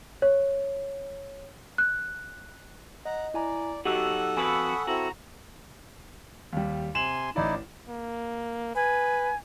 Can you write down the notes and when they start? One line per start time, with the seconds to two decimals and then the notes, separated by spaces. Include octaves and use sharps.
0.22 C#5
1.78 F#6
3.05 D#5 F#5 A#5
3.34 E4 D5 G#5 A#5
3.85 F#3 D#4 F#4 G4 A4 F#5 E6
4.37 F2 F#4 B4 G#5 B5 C#6 D#6 E6
4.87 C4 E4 F#4 A4 A#5
6.53 D#2 G3
6.95 C3 G#5 C6 E7 F#7
7.36 A1 D#4 E4 D5
7.89 A#3
8.75 B4 G#5